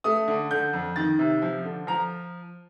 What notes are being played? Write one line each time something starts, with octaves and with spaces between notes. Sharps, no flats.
A3 D#6
D3
D3 G6
F2
D#3 A6
C3
F3
D3
F3 A#5